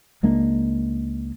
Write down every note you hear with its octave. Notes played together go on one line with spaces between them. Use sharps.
C#2 G#3 A#3 D4